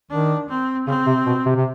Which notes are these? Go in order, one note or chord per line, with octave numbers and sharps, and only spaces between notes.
D#3 D4
C4
C#3 C4
C3
B2
C3
C3